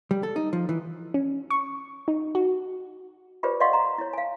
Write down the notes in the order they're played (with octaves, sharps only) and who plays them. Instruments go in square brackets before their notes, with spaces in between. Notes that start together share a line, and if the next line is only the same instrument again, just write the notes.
[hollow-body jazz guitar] G3
A4
D#4
F3
E3
[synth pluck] C#4
C#6
D#4
F#4
[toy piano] F4 G4 G#4 B4 C5 D5
D5 D#5 F5 F#5 C6 C#6
A#5 C6
E4 C#5
F5 G#5